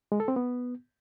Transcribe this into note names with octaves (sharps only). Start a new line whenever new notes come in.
G#3
A4
C4
B3